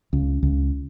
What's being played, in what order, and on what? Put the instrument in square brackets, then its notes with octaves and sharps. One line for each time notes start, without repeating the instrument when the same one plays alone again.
[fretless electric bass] C#2
C#2